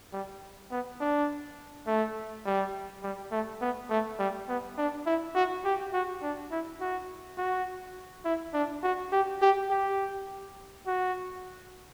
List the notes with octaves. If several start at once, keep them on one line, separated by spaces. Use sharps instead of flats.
G3
B3
D4
A3
G3
G3
A3
B3
A3
G3
B3
D4
E4
F#4
G4
F#4
D4
E4
F#4
F#4
E4
D4
F#4
G4
G4
G4
F#4